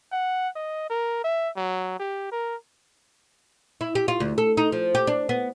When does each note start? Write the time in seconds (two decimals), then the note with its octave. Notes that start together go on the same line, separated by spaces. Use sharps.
0.12 F#5
0.56 D#5
0.90 A#4
1.24 E5
1.57 F#3
2.00 G4
2.32 A#4
3.81 E4
3.95 G4
4.08 F4
4.20 D2
4.38 A4
4.57 D#4
4.72 F3
4.95 G4
5.07 D4
5.29 B3